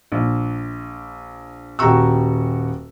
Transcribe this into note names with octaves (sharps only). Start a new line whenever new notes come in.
A#1
D#1 F#4 G4 A#5 C#6 E6